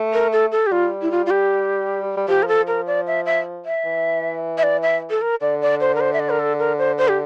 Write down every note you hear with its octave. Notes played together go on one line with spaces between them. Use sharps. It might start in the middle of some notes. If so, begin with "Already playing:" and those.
Already playing: A3
A#4
A4
A4
G4
G3 F4
E4
F4
F4
G4
G3
F3 G4
A#4
A4
A#4
D5
E5
E5
E5
E3
E5
D5
E5
A4
A#4
D3 D5
D5
C5
A#4
C5
E5
D5
A#4
A4
A#4
C5
C5
G4